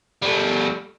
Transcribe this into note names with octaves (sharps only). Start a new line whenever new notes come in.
G3 A3